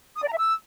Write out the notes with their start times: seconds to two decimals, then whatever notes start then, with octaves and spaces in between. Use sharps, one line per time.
0.16 D#6
0.21 D5
0.27 A#5
0.32 E5
0.37 E6